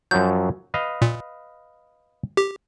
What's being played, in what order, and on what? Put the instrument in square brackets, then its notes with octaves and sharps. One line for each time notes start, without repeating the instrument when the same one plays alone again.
[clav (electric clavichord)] F#2 F3 F#3 [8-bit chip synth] G6
[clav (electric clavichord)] B4 D#5 F5
[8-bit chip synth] A#2
G4